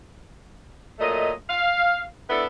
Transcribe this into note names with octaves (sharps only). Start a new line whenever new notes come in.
A#2 F#3 A3 D#5
F5
B3 D4 E4 A4